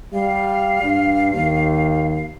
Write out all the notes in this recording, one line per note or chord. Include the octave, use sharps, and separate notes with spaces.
G3 F5
G2
D#2